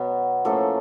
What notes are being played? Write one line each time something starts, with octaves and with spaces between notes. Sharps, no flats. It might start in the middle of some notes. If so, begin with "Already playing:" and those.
Already playing: B2 F#3 B3 B4
A2 F3 A#3 C#4 A4